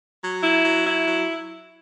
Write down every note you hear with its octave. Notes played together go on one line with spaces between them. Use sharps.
F#3
E4
F#3
E4
F#3